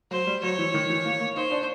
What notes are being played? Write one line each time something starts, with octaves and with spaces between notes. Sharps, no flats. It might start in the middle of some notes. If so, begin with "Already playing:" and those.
F#3 C5
G3
F#3 C#5
E3
D#3
E3
A#3
A#3
D#4 C5
D4